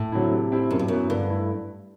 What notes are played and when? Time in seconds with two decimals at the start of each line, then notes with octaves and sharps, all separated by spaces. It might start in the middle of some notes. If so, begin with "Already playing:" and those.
Already playing: A2
0.12 D3 F#3 C4 E4
0.32 C3
0.52 G3 C4 E4
0.71 F#2 B2
0.79 G2
0.88 F#2 F#3 B3 E4
1.10 G2 D3
1.28 A3 E4